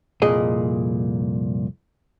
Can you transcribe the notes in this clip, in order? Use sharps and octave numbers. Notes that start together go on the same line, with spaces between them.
C2 F2 A#2 G#4 D#5